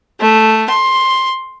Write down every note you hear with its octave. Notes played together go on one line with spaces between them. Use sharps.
A3
C6